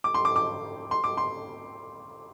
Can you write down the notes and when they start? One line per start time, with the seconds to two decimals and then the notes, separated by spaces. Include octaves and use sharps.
0.04 D6
0.14 C6
0.25 D6
0.36 D6
0.91 C6
1.04 D6
1.17 C6